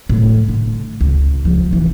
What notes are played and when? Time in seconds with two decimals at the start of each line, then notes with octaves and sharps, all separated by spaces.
0.10 A2
0.48 D3
1.00 C#2
1.45 F3
1.73 E3